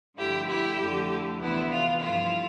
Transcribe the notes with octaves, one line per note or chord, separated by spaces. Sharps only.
G2 D3 F3 A3 E4 G4
E4 G4
F2 D3 A3 E4
D2 C3 E3 B3 D4 E4
F4
G2 F3 A3 E4 F4